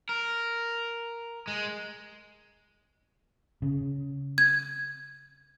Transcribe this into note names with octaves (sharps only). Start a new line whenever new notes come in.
A#4
G#3
C#3
G#6